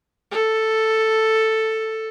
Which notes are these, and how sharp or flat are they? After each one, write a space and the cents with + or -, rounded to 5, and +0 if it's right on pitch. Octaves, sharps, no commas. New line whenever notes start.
A4 +5